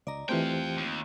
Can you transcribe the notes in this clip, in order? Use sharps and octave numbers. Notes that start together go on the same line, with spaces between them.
C#2 D5 D#5 A#5
E3 A3 C4 F4 G4 C5 F5 G5
D#2